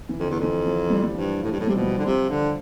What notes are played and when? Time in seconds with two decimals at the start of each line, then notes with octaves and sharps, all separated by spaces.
0.09 E3
0.19 F2 D3
0.30 E2
0.40 F2 E3
0.66 F3
0.90 G3
1.03 G3
1.13 G2 F3
1.43 A2
1.52 G2
1.60 A2
1.67 C3 G3
1.74 B2 F3
1.81 G3
1.98 D3
2.06 C3 F3
2.30 D3